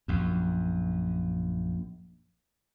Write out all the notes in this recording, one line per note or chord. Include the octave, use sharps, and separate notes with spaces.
A#1 F#2